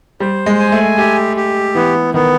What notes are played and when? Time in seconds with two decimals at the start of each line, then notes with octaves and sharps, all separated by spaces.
0.20 G3 C5
0.46 G#3
0.59 G#5
0.72 A3
0.98 A3 G4
1.37 G4
1.75 E3 B3
2.14 D#3 B3